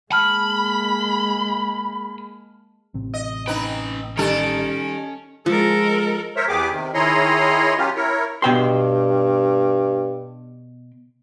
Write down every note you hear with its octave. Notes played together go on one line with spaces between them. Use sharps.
G#3 A#3 A5 B5 F6
A1 C3 C4
D#5
C#4 D#4 B4 G5
D#3 G3 C#4 A4
F3 G#3 A4 A#4
A#4 C5 C#5 E5
E2 B3 G4 G#4 D6
C3 D#3
D#3 E4 G#4 C#5 A#5 C6
F#3 A#3 C#4 F4 G4
E4 A#4 C#5
G2 B2 G5 C6